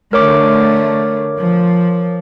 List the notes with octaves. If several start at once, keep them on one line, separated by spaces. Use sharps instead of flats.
D3 A3 A#4 C#5 D6
F3